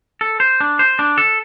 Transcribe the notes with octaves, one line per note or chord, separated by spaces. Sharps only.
A4
C5
D4
C5
D4
A4